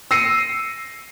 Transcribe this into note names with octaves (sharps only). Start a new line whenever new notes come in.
E6 A#6 C7 C#7 D#7